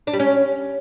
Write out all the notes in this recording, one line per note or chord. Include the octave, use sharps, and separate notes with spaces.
D4
G3
C#4